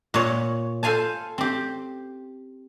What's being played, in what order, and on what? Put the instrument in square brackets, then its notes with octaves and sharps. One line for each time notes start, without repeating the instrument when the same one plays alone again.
[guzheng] A#2 C#5
A4 C5 F5 G#5 A5
C4 G4